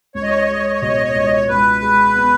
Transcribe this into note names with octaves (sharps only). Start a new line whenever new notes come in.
C#2 C#5
D#5
C#5
D#5
C#5
G#3 D#5
C#5
D#5
C#5
B2 D#5
C#5
D#5
C#5
D#5
C#2 C#5
D#5
C#5
C#2 B4
G#3
B3